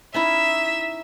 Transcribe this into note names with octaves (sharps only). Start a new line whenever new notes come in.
C#4 D#4 E4 E5